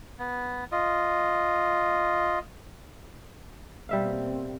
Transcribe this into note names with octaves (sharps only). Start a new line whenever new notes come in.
B3
F4 D#5
B2 G3 A#3 C4 E5 F5